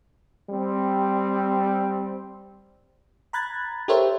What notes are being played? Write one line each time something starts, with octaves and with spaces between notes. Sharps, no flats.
G3 C4
A#5 B5 F#6 G#6 A6
G4 A4 A#4 C5 C#5 E5